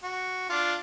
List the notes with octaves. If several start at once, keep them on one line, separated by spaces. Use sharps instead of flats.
F#4
D4 F4